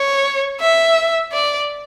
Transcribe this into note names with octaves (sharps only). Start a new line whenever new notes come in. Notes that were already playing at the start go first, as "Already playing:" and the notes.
Already playing: C#5
E5
D5